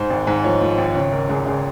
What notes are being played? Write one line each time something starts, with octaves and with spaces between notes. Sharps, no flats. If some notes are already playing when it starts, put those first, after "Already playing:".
Already playing: G#2 C5
G#1
G#2
F3 C#5
F3
G#1
C#2 C#5
C#2 A#4
C#2 G#4
C#2 G#4